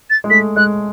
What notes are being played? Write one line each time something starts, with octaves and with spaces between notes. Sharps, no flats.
A6
G#3
A3 B6
G#3 F#6